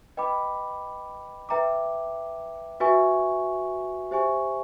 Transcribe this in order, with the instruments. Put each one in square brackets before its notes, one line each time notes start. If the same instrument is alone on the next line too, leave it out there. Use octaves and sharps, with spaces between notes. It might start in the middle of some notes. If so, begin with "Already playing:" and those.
[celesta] B4 D#5 G5 B5 D6
B4 E5 G5 A#5 D6
F#4 B4 E5 G#5 C#6
G4 C5 E5 G#5 C#6